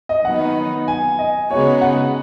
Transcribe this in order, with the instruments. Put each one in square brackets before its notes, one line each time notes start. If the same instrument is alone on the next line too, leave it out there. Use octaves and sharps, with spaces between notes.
[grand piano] D#5
[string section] D#3 F#3 B3 D#4 [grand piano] F#5
[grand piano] G#5
D#5
[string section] C#3 G#3 B3 D#4 F#4 [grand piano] C#5
[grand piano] F#5